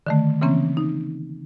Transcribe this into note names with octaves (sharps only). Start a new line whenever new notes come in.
D3 D#3 A3
C#3 E3 A#3 C4 C#4
D#4